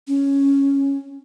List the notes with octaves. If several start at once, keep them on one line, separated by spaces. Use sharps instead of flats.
C#4